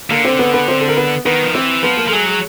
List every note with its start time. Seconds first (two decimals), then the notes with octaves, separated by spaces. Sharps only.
0.10 D3 A#3 A#4
0.25 C4 C5
0.39 B3 B4
0.54 B3 B4
0.68 C4 C5
0.81 A4
0.88 A#4
0.97 B3 B4
1.25 D#3 B3 B4
1.43 F3
1.54 E3 C4 C5
1.83 F3 B3 B4
1.97 A#3 A#4
2.08 F3 A4
2.12 F#3 G#3 G#4
2.26 G#3 G#4